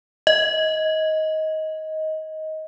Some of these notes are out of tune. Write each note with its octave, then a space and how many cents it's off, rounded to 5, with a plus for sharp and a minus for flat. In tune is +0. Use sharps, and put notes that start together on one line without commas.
D#5 +15